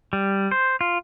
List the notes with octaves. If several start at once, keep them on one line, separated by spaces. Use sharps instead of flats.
G3
C5
F4